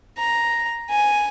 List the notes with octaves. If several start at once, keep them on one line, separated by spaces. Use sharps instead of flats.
A#5
G#5